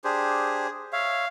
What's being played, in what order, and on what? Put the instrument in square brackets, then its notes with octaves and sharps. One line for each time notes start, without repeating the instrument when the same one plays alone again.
[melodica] D4 G4 C5 [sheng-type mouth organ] G#4
[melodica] C#5 E5 [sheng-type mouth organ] F5